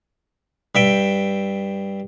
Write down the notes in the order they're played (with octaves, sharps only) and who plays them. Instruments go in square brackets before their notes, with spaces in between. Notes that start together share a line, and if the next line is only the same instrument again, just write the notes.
[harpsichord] G2 E5 G5